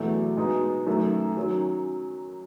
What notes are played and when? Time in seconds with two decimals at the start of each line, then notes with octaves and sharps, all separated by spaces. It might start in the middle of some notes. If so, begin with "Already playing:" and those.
Already playing: E2 B2 F#3 A3
0.37 B2 G#3 B3 D#4 G#4
0.87 F#2 D#3 A3
1.36 D#3 F#3 C#4